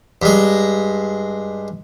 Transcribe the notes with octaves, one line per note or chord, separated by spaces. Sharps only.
G2 G#3